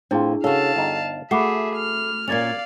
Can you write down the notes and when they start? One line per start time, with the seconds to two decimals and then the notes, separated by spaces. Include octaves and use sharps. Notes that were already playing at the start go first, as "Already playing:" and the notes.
0.11 A2 C4 D4 E4 F4 G#4
0.44 C#3 F#4 A4 F5 A5
0.76 G1 D#4
1.31 A3 F#4 G#4 E5 B5 D6 C7
1.76 F6
2.28 A#2 A#3 C#4 D5 F5 G#6 A6 F7